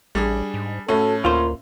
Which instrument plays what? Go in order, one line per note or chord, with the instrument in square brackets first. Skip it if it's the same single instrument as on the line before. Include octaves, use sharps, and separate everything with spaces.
[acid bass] A1 [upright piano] G3 D4 G#4
[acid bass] G#2
[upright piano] A2 C#4 [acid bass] F#4 [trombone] A4
[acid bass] D2 [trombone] A#3 [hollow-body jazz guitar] F4 C5